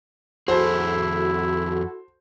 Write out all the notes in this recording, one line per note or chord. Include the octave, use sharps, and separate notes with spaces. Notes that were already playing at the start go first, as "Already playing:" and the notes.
F2 E4 F#4 G#4 A4 C5